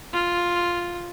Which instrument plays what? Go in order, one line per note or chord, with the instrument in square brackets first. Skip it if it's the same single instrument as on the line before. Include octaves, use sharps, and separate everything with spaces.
[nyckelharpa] F4